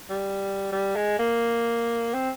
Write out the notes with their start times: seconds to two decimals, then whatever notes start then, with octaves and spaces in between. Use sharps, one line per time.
0.10 G3
0.72 G3
0.96 G#3
1.19 A#3
2.14 C4